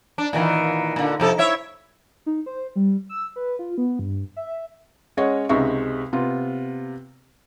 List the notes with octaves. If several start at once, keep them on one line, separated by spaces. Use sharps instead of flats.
D4
A#2 D#3 E3
A#2 D3
F2 C3 A4
E4 C#5 E5
D#4
C5
G3
E6
B4
F4
B3
G2
E5
G#3 C#4 C#5 D#5 F#5
C#2 C3 G#3 D#4 E5 C#6
C3 B3 F4